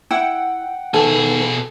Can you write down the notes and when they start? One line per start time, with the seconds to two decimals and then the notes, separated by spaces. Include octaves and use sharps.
0.11 E4 F#5 G5
0.94 B2 D#3 B3 G#4 A4